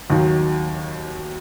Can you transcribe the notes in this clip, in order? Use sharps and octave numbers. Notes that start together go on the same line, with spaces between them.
D#2 D#3 F#3